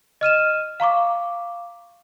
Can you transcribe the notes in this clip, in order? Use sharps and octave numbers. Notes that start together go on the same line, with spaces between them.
D#5 F6 D#7 E7
F5 A#5 C#6 D6